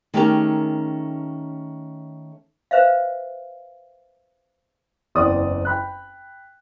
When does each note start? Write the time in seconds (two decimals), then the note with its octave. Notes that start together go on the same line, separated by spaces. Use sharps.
0.14 D#3 A3 C#4 G4 G#4 A#4
2.71 B4 C5 E5 F5
5.15 F#1 E2 C4 D5 D#6
5.65 G5 B5 F#6